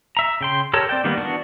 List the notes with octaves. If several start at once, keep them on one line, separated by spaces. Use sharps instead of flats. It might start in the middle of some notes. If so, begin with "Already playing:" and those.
E5 A#5
C#3 G5 C6
G4 A4 A#4 C#5 A5
C4 D5 G5
D#3 G3 A#3 B3
E3 B3 D4 F#4